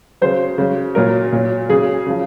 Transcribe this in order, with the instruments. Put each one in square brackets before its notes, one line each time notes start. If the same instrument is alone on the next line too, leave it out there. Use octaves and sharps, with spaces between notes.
[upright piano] C#3 F#3 C5
C#3 F#3
A#2 F#3 A#4
A#2 F#3
C#3 F#3 G#4
C#3 F3